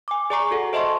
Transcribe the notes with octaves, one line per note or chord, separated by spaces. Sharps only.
G#5 D6
G#4 D5 G#5 A#5 C#6 C7
F#4 A4 F#5
C5 D#5 E5 A5 C6 C#6